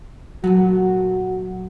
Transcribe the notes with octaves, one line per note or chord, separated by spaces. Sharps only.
A#2 F#3 A3 B3 F#4